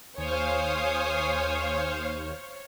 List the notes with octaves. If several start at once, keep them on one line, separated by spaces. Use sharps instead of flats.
D#2 C5 C#5 F5 G#5 D#6